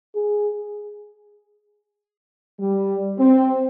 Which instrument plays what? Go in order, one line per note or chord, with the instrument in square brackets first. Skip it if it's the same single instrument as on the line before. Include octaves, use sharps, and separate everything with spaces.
[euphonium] G#4
[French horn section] G3
C4